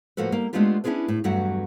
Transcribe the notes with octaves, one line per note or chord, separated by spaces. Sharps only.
A2 F3 A#3 F#4 A4 B4
G3 A#3
G#3 A3 B3 D4 F4 G4
C#4 D4 E4 F4 G#4 B4
A2
E2 G2 F#3 A3 F#4 F#5